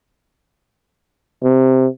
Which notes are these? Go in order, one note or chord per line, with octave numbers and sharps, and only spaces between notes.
C3